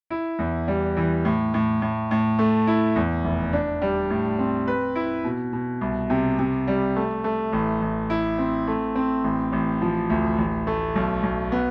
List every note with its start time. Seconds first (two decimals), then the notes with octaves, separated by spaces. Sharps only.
0.10 E4
0.39 E2
0.68 G3
0.97 E3
1.25 A2
1.54 A2
1.82 A2
2.11 A2
2.39 A3
2.67 E4
2.96 E2
3.25 F1
3.53 D4
3.82 G3
4.10 A2
4.39 C4
4.67 B4
4.95 E4
5.24 B2
5.53 B2
5.81 C2
6.10 C3
6.39 C3
6.67 G3
6.96 A3
7.24 A3
7.53 A1
7.82 A1
8.10 E4
8.38 C4
8.67 A3
8.95 C4
9.24 A1
9.52 A1
9.82 F3
10.10 D2
10.38 A1
10.67 A3
10.95 B1
11.23 B1
11.52 B3